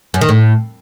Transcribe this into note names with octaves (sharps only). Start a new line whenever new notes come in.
F#2
D#3
A2